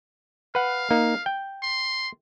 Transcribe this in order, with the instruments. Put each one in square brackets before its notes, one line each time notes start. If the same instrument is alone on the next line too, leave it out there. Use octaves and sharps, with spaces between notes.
[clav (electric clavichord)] B4 F#5 [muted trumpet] F5
[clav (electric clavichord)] A#3 D#4
G5
[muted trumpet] C6